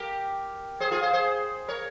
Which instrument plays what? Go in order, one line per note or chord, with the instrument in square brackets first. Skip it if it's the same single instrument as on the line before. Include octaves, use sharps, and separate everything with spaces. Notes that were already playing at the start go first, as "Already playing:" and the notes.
Already playing: [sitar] G4 A#4
G#4 C5
F4 G#4
G#4 C5
G#4 C5
A#4 C#5